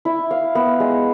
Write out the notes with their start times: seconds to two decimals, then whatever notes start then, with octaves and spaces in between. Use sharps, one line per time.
0.05 E4
0.31 F5
0.55 B3
0.80 G#3